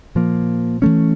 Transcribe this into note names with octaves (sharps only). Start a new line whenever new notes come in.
A#2 F3 A#3
E3 A3 C#4